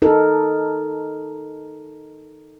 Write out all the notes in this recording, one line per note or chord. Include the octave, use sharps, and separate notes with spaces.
D#4 A4 A#4